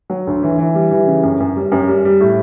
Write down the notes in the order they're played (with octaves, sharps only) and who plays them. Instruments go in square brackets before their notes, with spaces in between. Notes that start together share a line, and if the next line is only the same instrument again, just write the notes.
[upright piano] F#3
D2
E3
E3
G3
E3
C#3
F#2
F#2
G3
F#2
G3
G3
A2